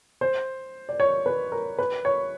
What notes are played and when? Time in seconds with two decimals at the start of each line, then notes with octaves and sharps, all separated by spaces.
0.21 C5
0.89 D5
1.00 C#5
1.26 B4
1.52 A#4
1.79 B4
2.05 C#5